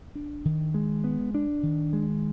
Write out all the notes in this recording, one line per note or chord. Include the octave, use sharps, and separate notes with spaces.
D4
D#3
G#3
B3
D4
D#3
G#3